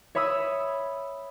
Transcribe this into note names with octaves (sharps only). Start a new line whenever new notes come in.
C#5 E5 B5 D#6 E6